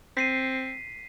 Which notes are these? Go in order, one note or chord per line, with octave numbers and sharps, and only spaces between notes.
C4 B6 C7 D#7